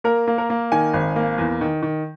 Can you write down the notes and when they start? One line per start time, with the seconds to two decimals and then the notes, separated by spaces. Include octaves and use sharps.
0.04 A#3 A#4
0.27 A#3
0.38 A#4
0.50 A#3
0.72 D#3 G#5
0.93 G#1
1.16 A#3
1.38 E2
1.61 D#3
1.83 D#3